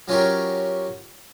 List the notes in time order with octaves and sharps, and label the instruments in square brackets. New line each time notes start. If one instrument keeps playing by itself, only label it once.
[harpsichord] F#3 C#4 F4 G4 A#4